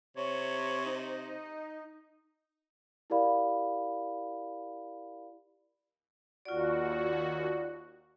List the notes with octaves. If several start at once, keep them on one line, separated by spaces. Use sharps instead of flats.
C3 C#5
D#4
E4 G4 A#4 D5 F5 B5
D#2 F4 F#4 D5